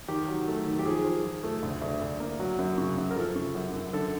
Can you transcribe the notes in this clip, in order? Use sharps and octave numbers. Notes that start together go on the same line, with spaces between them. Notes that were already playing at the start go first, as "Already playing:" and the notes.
D#3 G4
F#3
A3
D#3
G4
F3 G#4
F3
F3
A3
D2
D2
D2
A#3
F#3
F#2
C#3
F#2
A#4
F3 A4
C#3
F#2
F#2
D3 A4